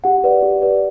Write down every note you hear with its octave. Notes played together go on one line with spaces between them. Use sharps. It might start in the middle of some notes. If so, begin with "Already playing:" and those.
G4 F#5
B4 D5
G4
B4 D5